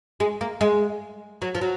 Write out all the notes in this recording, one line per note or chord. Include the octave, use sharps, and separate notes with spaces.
G#3
A#3
G#3
F#3
F3
F#3